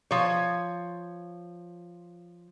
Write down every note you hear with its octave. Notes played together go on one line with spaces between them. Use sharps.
F3 C#5